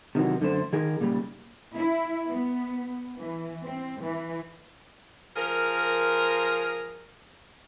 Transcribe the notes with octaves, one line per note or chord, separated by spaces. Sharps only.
C3 D#3 E3 F#3
F#2 D3 A3 C5
D#3 G#4 A#4
A#2 C#3 G3
E4
B3
E3
C4
E3
F3 G#4 A#4